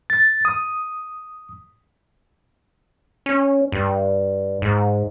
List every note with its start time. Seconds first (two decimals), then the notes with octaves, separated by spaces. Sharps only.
0.10 A6
0.45 D#6
3.26 C#4
3.72 G2
4.62 G#2